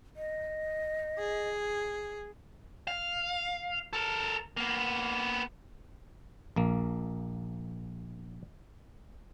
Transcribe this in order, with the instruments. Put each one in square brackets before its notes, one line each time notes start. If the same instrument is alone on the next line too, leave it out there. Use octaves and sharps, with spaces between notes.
[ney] D#5
[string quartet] G#4
[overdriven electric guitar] F5
A4 A#4
A#3 B3
[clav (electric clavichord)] A#1 A#3